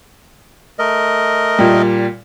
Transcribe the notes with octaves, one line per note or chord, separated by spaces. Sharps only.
A3 A#4 D#5
A#2 G3